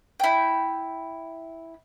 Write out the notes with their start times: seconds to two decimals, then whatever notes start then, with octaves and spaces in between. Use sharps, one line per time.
0.20 E4 G5